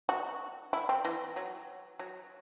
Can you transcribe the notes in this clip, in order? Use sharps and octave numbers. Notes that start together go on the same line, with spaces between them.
F#4
E4
C4
E3
F#3
F#3